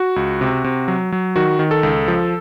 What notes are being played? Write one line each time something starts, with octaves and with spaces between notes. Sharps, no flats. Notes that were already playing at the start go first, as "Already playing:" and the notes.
Already playing: F#4
C#2
C3
C3
F#3
F#3
D#3 F#4
D#3
A4
C#2
F3